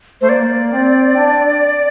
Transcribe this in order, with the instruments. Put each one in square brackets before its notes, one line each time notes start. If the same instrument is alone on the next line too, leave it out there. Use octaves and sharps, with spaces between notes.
[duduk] A3 [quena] C5
[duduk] A#3 [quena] D5
[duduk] C4
D4